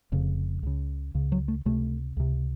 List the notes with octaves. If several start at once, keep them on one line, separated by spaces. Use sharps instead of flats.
F1 F2 C#3
C#2 C#3
C#2 C#3
F#3
A3
C#2 C3 A3
C#2 C3